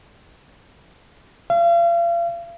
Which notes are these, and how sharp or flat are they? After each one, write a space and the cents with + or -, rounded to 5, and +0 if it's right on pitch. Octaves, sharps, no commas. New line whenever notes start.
F5 -40